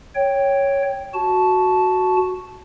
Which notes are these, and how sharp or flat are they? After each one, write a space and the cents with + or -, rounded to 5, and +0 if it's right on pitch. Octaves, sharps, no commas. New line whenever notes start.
C#5 +0 G5 +0
F#4 +0 A5 -10